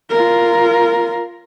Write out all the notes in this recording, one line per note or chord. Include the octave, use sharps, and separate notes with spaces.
F4 A#4